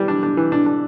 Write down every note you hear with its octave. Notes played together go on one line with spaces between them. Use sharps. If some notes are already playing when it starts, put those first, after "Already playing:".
Already playing: E3 G3
D4
D4
E3
D4
D4